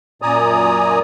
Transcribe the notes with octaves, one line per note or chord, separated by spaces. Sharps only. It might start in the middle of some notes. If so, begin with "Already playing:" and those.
F#2 A#2 D5 G#5 A#5 D#6